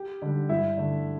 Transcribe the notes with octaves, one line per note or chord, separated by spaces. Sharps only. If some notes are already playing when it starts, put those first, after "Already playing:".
Already playing: G4
D3 G3
G2 E4 E5
D3 A3